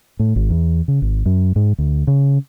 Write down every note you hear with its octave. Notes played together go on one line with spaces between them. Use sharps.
A2
G#1
E2
C#3
G#1
F#2
G#2
D2
C#3